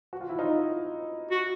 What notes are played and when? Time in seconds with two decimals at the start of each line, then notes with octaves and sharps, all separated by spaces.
0.13 F#4
0.21 F4
0.29 E4
0.39 D#4 F4
1.31 F#4